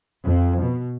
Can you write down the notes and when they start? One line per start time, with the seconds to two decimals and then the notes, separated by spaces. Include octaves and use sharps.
0.25 F2
0.61 B2